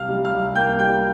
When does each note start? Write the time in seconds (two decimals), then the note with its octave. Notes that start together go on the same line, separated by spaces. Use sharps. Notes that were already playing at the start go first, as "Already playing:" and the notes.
Already playing: C2 C3 F5 F6
0.09 G3
0.24 F5 F6
0.32 C2
0.55 A#3 G5 G6
0.79 G3 G5 G6